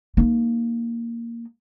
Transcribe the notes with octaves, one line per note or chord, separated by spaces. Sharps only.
A#3 D#4